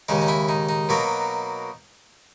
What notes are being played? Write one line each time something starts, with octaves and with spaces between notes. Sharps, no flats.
D#2 C#3 G#3 D#4
D#4
E4
D#4
D#4
B2 F#3 A#3